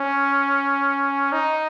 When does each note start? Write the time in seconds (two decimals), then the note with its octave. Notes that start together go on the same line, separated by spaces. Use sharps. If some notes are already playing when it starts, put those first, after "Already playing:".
Already playing: C#4
1.32 D#4